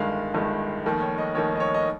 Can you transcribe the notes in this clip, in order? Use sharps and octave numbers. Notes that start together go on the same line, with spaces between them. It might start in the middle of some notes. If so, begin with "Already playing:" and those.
Already playing: G1 G2 D#3 G#3 F5
G1 G2 D#3 G#3
F1 D#2 D#3
C#5
D#5
F1 D#2 D#3 C#5
D#5
C#5
D#5